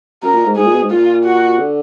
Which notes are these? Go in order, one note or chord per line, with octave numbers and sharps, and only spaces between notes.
F#2 A#4
A#2
G#2
G#2 G#4
A#2
B2
G#2
A#2 F4
F#4
D3